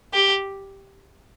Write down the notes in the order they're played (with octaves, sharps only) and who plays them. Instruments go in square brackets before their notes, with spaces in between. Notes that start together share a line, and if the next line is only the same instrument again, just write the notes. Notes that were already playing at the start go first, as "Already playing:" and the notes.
[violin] G4